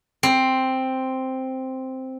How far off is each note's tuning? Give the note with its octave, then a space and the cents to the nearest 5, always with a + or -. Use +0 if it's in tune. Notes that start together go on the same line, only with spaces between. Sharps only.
C4 +0